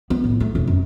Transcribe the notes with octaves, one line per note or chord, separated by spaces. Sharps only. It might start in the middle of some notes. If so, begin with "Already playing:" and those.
B3
A2
A3
E1
F#2